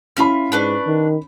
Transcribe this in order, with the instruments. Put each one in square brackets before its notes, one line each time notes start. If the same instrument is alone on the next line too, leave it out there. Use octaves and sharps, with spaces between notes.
[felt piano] C#4 E4 B5 [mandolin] F4 E5 F6
[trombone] G#2 [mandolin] D4 B4 C#6
[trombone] D#3